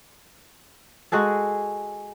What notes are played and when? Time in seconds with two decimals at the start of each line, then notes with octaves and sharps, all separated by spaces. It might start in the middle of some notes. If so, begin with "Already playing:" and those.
1.12 G#3 F#4 G#4 A4